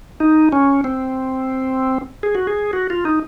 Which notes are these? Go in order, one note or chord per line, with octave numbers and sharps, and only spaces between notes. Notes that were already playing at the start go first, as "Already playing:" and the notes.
D#4
C#4
C4
G#4
F#4
G#4
F#4
F4
D#4